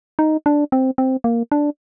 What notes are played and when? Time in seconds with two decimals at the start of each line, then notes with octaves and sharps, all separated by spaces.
0.19 D#4
0.46 D4
0.72 C4
0.98 C4
1.24 A#3
1.52 D4